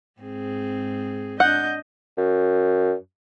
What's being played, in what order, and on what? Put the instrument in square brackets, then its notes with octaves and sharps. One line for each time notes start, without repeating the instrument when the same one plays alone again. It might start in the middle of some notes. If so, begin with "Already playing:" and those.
[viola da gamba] G#2 C4 G#4
[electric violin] D4 G6 [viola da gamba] D#5 [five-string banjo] F#5
[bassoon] F#2